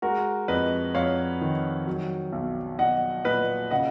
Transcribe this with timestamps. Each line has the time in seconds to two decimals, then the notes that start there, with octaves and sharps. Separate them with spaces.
0.02 G#3 F#4 A#4
0.48 F2 B4 D#5
0.95 F2 C#5 F5
1.41 D#3
1.87 F#3
2.32 B1
2.79 B1 D#5 F#5
3.25 A#2 B4 D#5
3.71 C#3 D#5 F#5